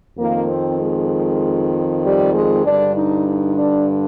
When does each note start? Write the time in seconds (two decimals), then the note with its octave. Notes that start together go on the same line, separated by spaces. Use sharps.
0.17 F2 D#3 A#3
0.47 C4
0.79 G#3
2.02 G3
2.33 G#3
2.64 G2 D3 D4
2.95 D#4
3.26 D#4
3.58 D4